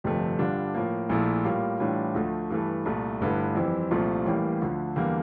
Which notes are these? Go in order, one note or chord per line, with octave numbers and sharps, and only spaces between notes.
G1 F2 C3 F3 A3
G2 D3 G3 D4 F4
A2 F3 A#3
A#1 A#2 A3 E4
A2 G3 A#3 F4
A2 E3 G3 D4 F4
D2 D3 F3 A3
G2 E3 A3
C2 A#2 A3
G1 G2 D3 A3 E4
F2 E3 G3 C4 E4
C2 A#2 F3 A3 C4
A1 A2 E3 G3 A#3
D2 D3 F3
E2 D3 G3 A#3